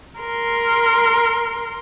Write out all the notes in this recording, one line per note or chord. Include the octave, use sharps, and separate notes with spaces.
A#4 C6